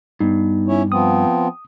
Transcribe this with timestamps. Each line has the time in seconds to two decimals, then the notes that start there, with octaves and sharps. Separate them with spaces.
0.20 G2 B3 D#4
0.68 C#4 E4 C#5
0.92 F3 B3 C4 D#6